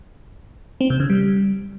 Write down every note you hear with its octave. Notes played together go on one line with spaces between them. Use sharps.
C4
C3
C#3
G3